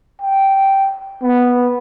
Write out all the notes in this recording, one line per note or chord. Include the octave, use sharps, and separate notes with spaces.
G5
B3